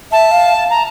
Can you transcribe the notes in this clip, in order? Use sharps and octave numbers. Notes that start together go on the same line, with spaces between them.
E5 A5
F5
A#5